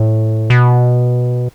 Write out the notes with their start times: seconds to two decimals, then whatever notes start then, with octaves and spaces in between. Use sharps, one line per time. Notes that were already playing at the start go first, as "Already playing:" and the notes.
Already playing: A2
0.50 B2